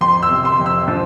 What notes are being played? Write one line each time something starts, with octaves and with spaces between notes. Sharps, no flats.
F2 C6
E6
C3
C6
F2
E6
F3